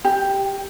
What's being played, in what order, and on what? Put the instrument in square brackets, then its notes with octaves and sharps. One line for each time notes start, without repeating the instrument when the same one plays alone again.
[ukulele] G4